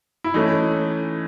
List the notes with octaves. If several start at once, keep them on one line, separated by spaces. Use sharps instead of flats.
E4
E3 A3 C#4 D#4